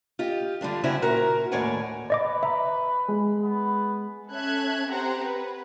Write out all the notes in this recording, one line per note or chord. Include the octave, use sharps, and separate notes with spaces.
F4 G4 D#5
D3 G3 D4 F4
C#3 C4 C#4 E4 F#4
A#2 F#4 A#4
D#2 A2 C#5 D5 F#5 G#5
B4 D5 D#5 D6
E5 A#5
G#3
B3
C#4 A4 E5 F#6 G#6
C4 G4 C5 F#5 A#5
B4